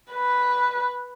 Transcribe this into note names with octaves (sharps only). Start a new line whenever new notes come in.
B4